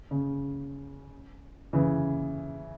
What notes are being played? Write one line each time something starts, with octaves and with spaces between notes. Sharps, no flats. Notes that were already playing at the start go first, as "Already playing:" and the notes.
C#3
C#3 E3